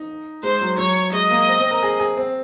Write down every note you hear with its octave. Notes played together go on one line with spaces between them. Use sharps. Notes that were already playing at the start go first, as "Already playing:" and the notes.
Already playing: D#4
G#3 C5
F#3
F#3 C#5
G#3 D#5
A#3
C4
C4
A#4
G#4
G#4
C4